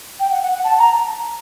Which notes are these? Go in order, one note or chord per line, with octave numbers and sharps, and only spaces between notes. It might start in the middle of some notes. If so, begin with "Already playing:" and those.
G5
F#5
F#5
F#5
A5
A#5